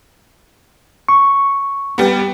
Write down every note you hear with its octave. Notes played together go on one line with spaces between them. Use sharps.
C#6
G3 B3